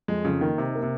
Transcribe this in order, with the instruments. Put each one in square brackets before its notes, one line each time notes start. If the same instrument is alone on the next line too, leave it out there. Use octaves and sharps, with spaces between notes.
[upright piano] F2 [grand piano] G#3
[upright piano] F2 [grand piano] C#3
[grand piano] D#3 [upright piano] A#3
[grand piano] C3 [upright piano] D#4
[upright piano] A#3
[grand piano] C3